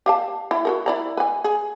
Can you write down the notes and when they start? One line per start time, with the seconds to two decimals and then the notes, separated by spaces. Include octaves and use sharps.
0.06 G4 F5 A5
0.51 E4
0.65 F#4 A4 A#4
0.86 E4 D5 A#5
1.17 B4 G#5
1.44 G#4